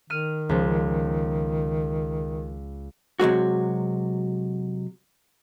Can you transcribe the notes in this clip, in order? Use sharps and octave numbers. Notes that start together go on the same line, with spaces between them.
D#3 F6 D#7
C#2 F3
C3 F#3 G#3 F#4